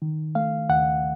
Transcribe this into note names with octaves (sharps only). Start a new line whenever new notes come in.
D#3
A3 F5
D#2 F#5